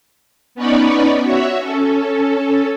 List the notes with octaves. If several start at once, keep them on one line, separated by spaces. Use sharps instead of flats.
B3 C#4 D#4 C#5 D5 B5
F#4 C#5 E5
C#4 A4